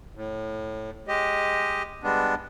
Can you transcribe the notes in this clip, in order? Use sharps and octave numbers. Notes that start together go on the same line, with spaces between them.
A2
G#3 G4 D#5
G3 G#3 B3 D4